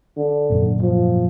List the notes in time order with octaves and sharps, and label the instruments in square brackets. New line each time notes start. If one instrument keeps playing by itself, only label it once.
[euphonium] D3
[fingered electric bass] G#1 F#2 A#2
[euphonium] F3